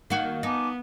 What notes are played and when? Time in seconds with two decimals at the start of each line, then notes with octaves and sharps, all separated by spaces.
0.10 D#3 A#3 F#4 G6
0.43 B3 D#4 G#5 A5 D6